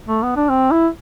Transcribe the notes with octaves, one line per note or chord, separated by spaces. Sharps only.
A3
B3
D4
C4
E4